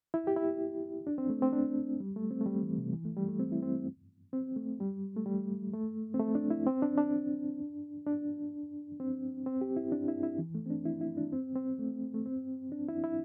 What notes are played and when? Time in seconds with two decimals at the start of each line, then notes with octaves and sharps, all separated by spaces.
0.14 E4
0.27 G4
0.37 E4
1.07 D4
1.18 C4
1.30 A3
1.42 C4
1.53 D4
2.00 G3
2.16 A3
2.31 C4
2.41 A3
2.46 G3
2.63 E3
2.78 C3
2.93 E3
3.05 A3
3.16 G3
3.28 A3
3.40 C4
3.52 E4
3.62 C4
4.33 C4
4.56 A3
4.80 G3
5.16 A3
5.26 G3
5.73 A3
6.14 C4
6.19 A3
6.35 D4
6.50 E4
6.67 C4
6.82 D4
6.98 D4
8.06 D4
9.00 C4
9.46 C4
9.61 G4
9.77 E4
9.92 D4
10.08 E4
10.23 E4
10.39 E3
10.55 A3
10.66 C4
10.70 D4
10.85 E4
11.01 E4
11.17 D4
11.32 C4
11.55 C4
11.79 A3
12.14 A3
12.26 C4
12.72 D4
12.88 E4
13.04 E4